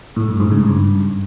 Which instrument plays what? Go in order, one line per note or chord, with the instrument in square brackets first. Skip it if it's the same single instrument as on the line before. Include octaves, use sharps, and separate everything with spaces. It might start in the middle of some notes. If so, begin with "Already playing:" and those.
[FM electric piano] A2
G2
G#2
C#3
G2